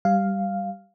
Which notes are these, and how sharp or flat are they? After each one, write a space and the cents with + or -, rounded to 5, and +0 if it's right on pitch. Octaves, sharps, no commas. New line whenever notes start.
G3 +0 F5 +0